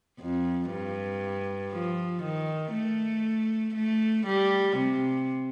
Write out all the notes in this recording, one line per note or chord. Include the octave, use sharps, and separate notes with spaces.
F2
G2
F3
D#3
A3
A3
G3
C3